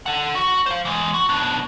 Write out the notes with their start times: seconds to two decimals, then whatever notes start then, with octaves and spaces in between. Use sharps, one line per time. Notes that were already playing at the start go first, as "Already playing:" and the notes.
0.06 A4 F#5
0.35 F#4
0.66 C5 F5
0.85 E3 G#3
1.14 F#4
1.29 B2 D4